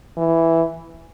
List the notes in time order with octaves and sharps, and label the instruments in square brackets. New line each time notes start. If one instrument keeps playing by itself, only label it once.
[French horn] E3